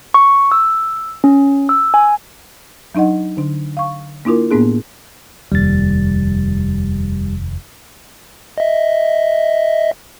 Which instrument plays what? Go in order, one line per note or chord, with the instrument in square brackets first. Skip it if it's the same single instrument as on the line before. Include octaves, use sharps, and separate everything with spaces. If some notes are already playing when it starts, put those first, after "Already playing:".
[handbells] C#6
E6
C#4
E6
G#5
[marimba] F#3 D4 D#4 D#5 F#5
D3 D4
F5 C#6
A#3 D4 E4 F4 A#4
A2 A#3 B3 D4 G#4
[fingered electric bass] F1 D#2 [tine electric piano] G3 A6
[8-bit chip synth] D#5 E5